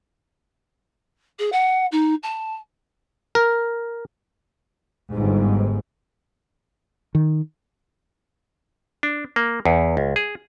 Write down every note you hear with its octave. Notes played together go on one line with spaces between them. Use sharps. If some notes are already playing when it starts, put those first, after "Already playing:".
G#4
F#5
D#4
A5
A#4
G1 G#2
D#3
D4
A#3
E2
C#2
G#4